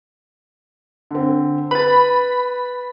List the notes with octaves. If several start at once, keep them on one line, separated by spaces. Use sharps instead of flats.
D3 C4
B4 B5 A6